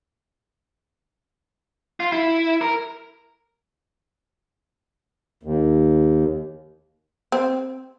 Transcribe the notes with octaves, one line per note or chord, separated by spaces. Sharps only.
F4
E4
A#4
D#2
C4